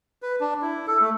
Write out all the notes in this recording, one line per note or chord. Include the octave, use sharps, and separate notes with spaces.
B4
D4
E4
A4
A3